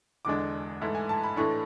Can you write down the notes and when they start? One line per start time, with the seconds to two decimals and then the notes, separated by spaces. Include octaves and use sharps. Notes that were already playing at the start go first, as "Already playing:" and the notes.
0.25 E1 E2 D3 G#3 D4 D6
0.81 G#2 E3 A3 E4
0.95 G#5
1.09 A5
1.23 B5
1.36 A2 E3 A3 D4 C#6